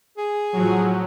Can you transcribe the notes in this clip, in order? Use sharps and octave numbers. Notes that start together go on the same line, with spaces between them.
G#4
A2 F3 F#3